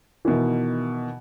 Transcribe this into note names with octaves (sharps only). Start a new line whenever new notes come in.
B2 D#3 E3